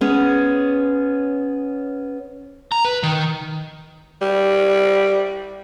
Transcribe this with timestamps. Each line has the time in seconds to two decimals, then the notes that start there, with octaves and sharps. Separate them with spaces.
0.01 B3 C#4 G#4
2.72 A#5
2.85 B4
3.03 D#3
4.21 G3